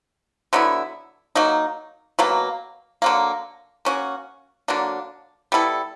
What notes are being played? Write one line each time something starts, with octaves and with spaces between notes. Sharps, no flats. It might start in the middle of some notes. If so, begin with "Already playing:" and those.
D3 F#3 B3 E4
F#3 A#3 D#4
B2 F#3 A#3
D3 F#3 A#3
A#3 C#4 F#4
D3 F#3 A#3 D4
G3 B3 E4 A4